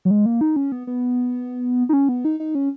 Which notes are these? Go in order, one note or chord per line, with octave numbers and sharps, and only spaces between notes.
F#3
G#3
A#3
D#4
C#4
B3
B3
D#4
C#4
B3
D#4
D#4
C#4